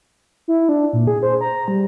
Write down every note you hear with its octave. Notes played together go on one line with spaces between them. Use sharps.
E4
D4
A#2
G#4
C5
A#5
G3